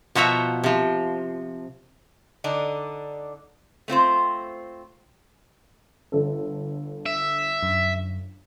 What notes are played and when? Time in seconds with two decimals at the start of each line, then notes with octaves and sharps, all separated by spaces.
0.15 B2 F3 F#4 E5 A#5
0.64 C3 F3
2.44 D3 D4 D#4
3.88 A3 C4 F4 C5
6.12 G1 A4
7.06 E5
7.63 F#2